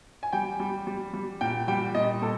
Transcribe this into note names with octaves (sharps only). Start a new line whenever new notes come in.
G#5
G3 G5
G3
G3
G3
A#2 G5
G3 G5
A#2 D#5
A#2 A4